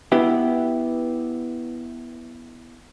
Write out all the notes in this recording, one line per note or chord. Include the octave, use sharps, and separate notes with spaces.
B3 E4 G4